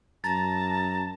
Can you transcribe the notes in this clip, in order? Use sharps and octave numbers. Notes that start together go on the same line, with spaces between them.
F#2 A5 A#5 A6